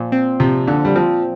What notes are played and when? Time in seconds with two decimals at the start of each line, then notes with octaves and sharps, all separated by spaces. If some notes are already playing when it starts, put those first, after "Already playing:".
Already playing: A#2 F3
0.12 C4
0.40 C3 F3
0.67 A#2 D3
0.85 G3
0.96 F3 C4